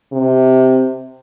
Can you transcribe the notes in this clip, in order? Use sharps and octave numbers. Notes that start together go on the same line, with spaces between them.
C3